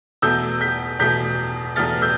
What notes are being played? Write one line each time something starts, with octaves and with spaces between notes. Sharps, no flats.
E2 B2 A3 E6 G6
G6 B6
E2 B2 A3 G6 B6
E2 B2 A3 F6 A6
E6 G6